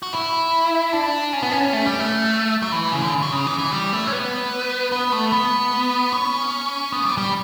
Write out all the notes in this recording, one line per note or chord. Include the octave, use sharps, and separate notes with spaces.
F#4
E4
D4
C#4
B3
C#4
A3
G3
A3
F#3
E3
C#3
D3
F#3
C#3
E3
E3
G3
A3
C#4
B3
B3
A3
B3
C#4
B3
G3
G3